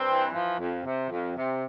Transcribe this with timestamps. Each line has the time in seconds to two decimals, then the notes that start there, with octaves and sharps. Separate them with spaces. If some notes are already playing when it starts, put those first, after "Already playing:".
Already playing: G2 C4
0.08 E3
0.34 F3
0.59 F2
0.84 C3
1.10 F2
1.35 C3